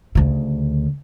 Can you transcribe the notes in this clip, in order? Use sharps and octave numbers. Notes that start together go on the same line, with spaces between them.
D2 C#3